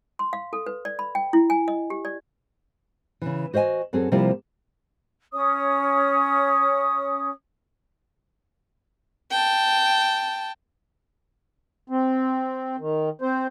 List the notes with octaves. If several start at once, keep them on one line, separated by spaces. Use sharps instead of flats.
C6
F5
A4
B4
D5
B5
G5
E4
G#5
D#5
G4
D5
C#3 E3
F#4 C5 D#5 E5 G#5
F#2 C4 F#4 G#4 A4
C3 F3 G3 A#3 E4 F4
C#4 C#5 D#6
G5 A5
C4
D#3
C4 C5